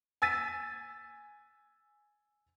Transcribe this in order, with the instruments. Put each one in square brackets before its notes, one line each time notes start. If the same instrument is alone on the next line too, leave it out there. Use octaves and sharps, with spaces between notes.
[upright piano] G#5 E6 A6 B6 D#7